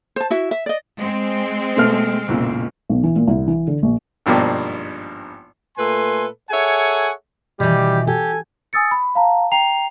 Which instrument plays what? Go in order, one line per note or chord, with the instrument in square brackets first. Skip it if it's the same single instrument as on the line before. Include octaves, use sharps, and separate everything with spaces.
[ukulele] C5 A5
E4 F#4 E5
E5
D5 D#5
[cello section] G#3 C4
[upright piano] B2 A3 F6
F#1 B1 A#2
[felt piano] B1
E3
A#2
C2
E3
D3
A#1
[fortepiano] G#1 G2 B2 F3 A#3 D5
[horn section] A#2 A3 A4 B4 G#5 C6
G#4 A4 C#5 E5 F#5 G#5
[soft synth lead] B2 [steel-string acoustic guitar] D#3 E3 [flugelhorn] G3 [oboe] G4
[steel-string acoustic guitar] G4 [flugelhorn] A4 [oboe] G#5
[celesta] G#5 D#6 E6 A6 C#7
B5
F5 A5 A#5
G5 A#5 C7 F7